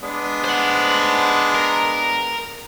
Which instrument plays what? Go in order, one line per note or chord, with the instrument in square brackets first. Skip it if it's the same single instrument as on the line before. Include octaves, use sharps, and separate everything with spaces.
[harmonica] G#3 B3 D4
[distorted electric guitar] C5 F#5
A#4